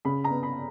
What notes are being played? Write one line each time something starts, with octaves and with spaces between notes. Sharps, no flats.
C#3 B5
A#5
B3
B5